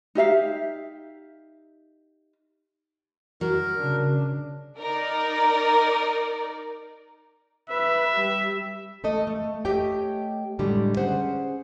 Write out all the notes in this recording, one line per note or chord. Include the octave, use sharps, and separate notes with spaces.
D#4 G4 E5 F5
F#3 A#4
C#3 D4
D#4 A#4 D5
B4 E5
G3
A3 A4 D#5
A3
A3 G4 C#5 D#5 G5
A2 D3 G3 G#3
C#4 G#4 C5 F#5